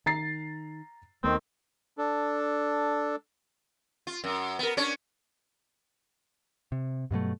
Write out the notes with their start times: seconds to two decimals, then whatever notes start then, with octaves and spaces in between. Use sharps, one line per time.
0.06 D#3 A#5 A6 C7
1.24 D#2 D#3 A3 B3 C4
1.98 D4 A4
4.07 F4
4.24 F#2
4.59 B3 A#4
4.77 C#4 D4 C#5
6.72 C3
7.11 G2 B2 F#3 A3